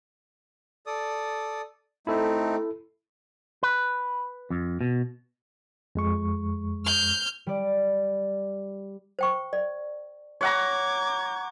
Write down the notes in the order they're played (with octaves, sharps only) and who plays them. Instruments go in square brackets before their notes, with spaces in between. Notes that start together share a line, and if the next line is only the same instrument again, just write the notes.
[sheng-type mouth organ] A4 D5 D#6
[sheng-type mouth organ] A3 C4 D#4 [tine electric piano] E4 A4
[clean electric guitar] B4
F2
B2
[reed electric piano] F2 G#3 C#6
[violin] F6 G6
[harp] G3 D5
[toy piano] C5 G5 C#6
D5
[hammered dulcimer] C#5 F#5 A#5 [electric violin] D6 G#6